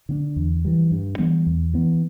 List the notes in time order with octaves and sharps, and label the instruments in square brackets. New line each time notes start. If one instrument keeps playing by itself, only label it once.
[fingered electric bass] D3 B3 D4
E2
E3 G3
G2
E3 G3 B3
E2
E3 B3